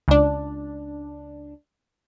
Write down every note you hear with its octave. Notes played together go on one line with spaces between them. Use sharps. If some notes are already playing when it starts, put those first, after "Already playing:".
C#2 D4